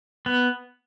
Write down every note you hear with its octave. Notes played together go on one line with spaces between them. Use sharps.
B3